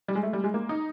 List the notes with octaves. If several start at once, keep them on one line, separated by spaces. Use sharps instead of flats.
G3
G#3
A3
G3
G#3
A#3
D#4